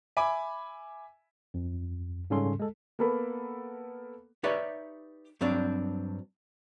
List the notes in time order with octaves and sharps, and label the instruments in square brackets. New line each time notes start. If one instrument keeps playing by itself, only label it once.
[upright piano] E5 G#5 B5 D6
[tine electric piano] F2
G#2 C#3 G3 C#4 A4 C6
G#3 A4
[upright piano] A#3 B3 A4 A#4 B5
[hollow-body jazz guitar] D#4 G4 B4 C#5 D5 E5
G2 F#3 C4 D4